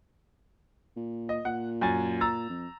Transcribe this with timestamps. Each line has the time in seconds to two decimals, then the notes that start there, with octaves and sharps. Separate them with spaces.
0.96 A#2
1.29 D#5
1.45 A#2 F#5
1.81 F#2 G#5 A6
2.21 A#5 E6 A6
2.50 F2